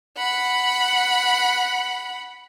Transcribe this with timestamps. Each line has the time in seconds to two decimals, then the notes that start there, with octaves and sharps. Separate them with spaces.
0.18 F#5 B5